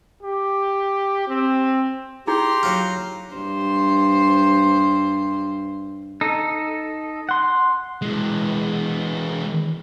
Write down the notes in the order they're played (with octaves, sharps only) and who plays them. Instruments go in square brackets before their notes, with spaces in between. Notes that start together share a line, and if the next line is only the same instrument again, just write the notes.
[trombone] G4
C4
[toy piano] D#4 E4 G#4 [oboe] G4 [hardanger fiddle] A#5 C6
[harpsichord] F#3 F4
[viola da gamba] G2 C5
[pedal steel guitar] D#4 A4
F#5 C6
[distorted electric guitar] E3 G#3